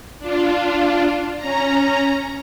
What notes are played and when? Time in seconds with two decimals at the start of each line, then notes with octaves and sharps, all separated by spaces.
0.19 D4 F4
1.37 C#4 A#5